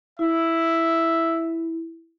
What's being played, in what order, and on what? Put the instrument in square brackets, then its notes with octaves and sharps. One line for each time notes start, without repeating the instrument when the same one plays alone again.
[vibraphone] E4 [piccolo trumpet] E5